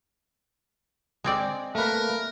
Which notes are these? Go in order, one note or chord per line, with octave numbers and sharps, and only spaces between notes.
G#3 C4 D5
A3 A#3 A#4 B4